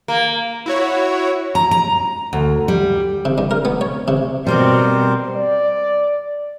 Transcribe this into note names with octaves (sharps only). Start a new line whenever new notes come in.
A#3
E4 F#4 C#5
A#5
A#5
D2
G3
C3
G2
A#4
B3
C#5
C3
B2 G3 C4 G4 A#4 C5
D5